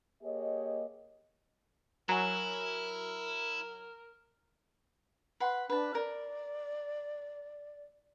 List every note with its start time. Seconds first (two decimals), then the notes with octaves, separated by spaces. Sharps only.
0.23 A#3 G4 G#4 C#5 D#5
2.09 F#3 E4 A#4 G#5 A#5
5.40 B4 F#5 C6
5.70 D4 B4 A5
5.95 A#4 D5